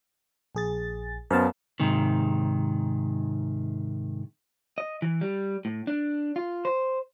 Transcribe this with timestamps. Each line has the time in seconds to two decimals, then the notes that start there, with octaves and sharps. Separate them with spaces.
0.55 A#1 G#4 A6
1.30 F#2 B3 C5 F5 A5
1.80 G#2 C3 D#3
4.78 D#5
5.02 E3
5.21 G3
5.65 A2
5.87 D4
6.36 F4
6.65 C5